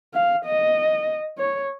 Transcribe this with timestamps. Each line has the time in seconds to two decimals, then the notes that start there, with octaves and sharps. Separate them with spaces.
0.14 F5
0.45 D#5
1.38 C#5